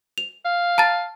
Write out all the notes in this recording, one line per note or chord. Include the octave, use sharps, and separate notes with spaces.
F7
F5
A5 A#5 A6